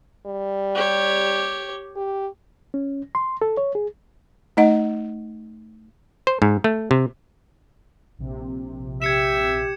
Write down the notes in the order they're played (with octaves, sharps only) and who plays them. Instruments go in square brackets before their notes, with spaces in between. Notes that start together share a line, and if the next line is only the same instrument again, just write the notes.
[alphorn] G3
[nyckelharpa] G4 C#5
[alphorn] G4
[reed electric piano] C#4
C6
A4
C#5
G#4
[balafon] A3 D#4 D#5 F#5
[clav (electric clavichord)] C5
G#2
A3
C3
[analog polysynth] A#1 C3
[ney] G4 [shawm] E5 [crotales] G#6 C#7 E7